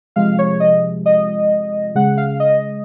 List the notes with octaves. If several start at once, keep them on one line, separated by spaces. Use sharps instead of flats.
C3 F3 G#3 F5
C#5
D#5
D#5
C#3 G#3 F#5
F5
D#5